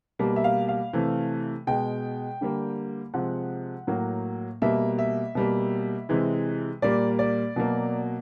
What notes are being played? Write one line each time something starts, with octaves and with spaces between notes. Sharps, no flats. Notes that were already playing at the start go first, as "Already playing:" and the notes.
B2 G3 A#3
E5
F5
F5
C3 E3 A3
B2 G#3 G5
D3 G3 A#3
C3 F3 G#3 F#5
A2 F#3 A#3
B2 G3 A#3 E5
E5
B2 G3 A#3
C3 E3 G#3
A#2 G3 A#3 D5
D5
B2 F#3 A#3